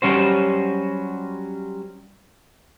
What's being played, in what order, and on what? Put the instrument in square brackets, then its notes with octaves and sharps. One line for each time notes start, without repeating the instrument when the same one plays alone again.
[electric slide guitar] F#3 G3 C#4 F#4 C5